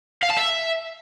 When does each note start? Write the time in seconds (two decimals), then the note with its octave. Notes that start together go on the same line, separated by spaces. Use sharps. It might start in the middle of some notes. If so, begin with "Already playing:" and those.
0.23 F5
0.30 A5
0.37 E5